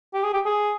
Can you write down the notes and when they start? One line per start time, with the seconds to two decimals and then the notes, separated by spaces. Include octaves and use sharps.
0.15 G4
0.24 G#4
0.34 G4
0.46 G#4